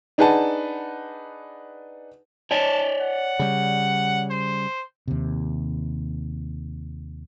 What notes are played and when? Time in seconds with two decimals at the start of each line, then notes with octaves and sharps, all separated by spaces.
0.18 D4 D#4 G#4 B4 F#5 A5
2.51 C#5 D5 G#5 A5
3.01 F#5
3.39 C#3 G3
4.30 C5
5.08 D#2 C3